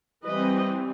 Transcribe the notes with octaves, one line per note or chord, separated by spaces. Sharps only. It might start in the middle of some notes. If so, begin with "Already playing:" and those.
E3 G3 C4 B4 D#5